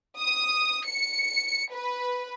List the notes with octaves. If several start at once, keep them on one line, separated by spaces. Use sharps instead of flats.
D#6
C#7
B4